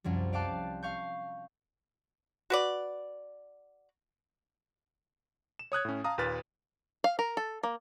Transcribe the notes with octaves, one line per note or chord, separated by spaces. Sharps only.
C2 F#2 F3 G3
D5 F5 G5 A5 D6 F#6
F5 C#6 G6
F#4 B4 D5
E7
C#5 D#6 F#6 G#6
A2 C#4
F5 A5 A#5 D#6
D#2 A#2 B4 F6 A6
F5
A#4
A4
A#3